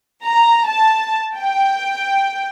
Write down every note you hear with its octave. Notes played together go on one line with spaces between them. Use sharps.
A#5
A5
G5